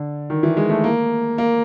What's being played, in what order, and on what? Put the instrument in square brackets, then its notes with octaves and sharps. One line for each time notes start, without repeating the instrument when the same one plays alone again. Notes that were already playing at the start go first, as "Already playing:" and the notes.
Already playing: [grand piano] D3
D#3
E3
G#3
A3
A#3
A#3